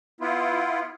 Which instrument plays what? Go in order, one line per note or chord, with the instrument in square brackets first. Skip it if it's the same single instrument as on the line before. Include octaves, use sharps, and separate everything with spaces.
[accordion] B3 E4 F4